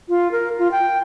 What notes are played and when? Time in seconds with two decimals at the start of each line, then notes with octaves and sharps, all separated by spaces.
0.09 F4
0.32 A#4
0.59 F4
0.72 G5